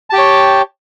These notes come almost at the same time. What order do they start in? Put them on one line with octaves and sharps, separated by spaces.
A5 G4 G5 C#5